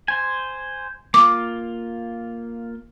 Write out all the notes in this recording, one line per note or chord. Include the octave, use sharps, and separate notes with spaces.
C5 G#5
A#3 F4 D6